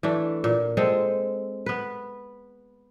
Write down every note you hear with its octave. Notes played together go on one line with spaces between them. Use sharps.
E3 A3 D4
A#2
G#3 C4 A4
B3 B4